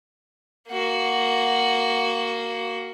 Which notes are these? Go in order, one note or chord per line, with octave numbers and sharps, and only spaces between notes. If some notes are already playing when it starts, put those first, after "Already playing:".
A#3 F#4